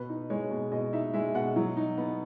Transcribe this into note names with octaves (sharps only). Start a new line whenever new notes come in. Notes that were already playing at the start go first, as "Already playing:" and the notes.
Already playing: B2 B4
D#4
G#3 C#5
B2
B2 D#5
D#4 E5
G#3 E5
B2 F#5
F#3
D#4
B3